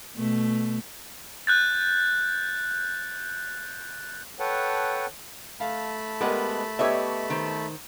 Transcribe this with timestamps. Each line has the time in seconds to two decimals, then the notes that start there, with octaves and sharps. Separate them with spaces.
0.16 B2 A3
1.47 F#6 G6 A6
4.40 A4 B4 C#5 F#5 G5 A5
5.60 A3 F5 A5 B5
6.21 G#3 B3 G4 A#4 D#5
6.79 B3 G4 C#5 D#5 E5 G#6
7.30 D#3 C5